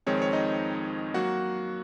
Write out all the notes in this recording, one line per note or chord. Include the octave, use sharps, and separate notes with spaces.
F2 D#3 G#3 C4 C#5
C#5
D#4 D#5
F#3 A#3 F#4 F#5